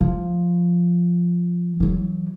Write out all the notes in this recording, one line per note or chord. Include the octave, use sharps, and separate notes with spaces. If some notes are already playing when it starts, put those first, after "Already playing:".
F3
E3 F#3